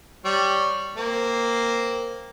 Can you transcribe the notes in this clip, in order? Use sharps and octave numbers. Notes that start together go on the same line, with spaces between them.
G3 C#5
A#3 C4